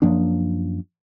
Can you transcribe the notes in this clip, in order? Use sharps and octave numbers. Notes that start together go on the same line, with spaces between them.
F#2 F3 A#3 D4